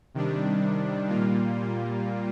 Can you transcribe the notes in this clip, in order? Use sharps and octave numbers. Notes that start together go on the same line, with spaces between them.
C3 D#3 G3 D4
A#2 G3 A#3 F4